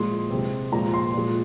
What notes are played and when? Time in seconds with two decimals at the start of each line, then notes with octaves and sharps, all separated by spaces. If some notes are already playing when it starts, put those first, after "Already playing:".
Already playing: A#2 F3 G#3 C6
0.30 C3 G#3
0.72 A#2 F3 G#3 A#5
0.93 C6
1.14 A#2 F3 G#3